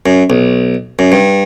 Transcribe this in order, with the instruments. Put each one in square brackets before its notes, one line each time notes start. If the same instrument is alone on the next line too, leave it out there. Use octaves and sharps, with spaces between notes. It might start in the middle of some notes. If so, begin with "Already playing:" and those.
[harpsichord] F#2
B1
F#2
G2